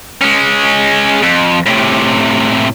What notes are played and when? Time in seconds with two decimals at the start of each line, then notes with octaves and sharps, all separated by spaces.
0.21 G#3 C#4
1.23 F2
1.66 A2 C3